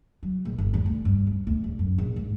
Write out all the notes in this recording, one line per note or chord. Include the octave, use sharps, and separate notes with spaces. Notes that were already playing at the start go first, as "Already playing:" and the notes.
F#3
A#1
G1
E2
D2
G2
F2
D2
D1
F#2
A#1
G#2